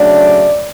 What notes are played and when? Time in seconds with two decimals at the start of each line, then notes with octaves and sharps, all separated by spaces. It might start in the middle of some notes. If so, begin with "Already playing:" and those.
Already playing: C#3 F#3 A3 D4 D5